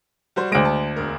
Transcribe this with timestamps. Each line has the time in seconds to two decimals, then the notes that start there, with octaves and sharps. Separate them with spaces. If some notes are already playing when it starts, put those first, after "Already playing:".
0.36 G3 F#4 C5
0.52 D2 G#3 A#6 D7
0.65 A5
0.96 E1 A#4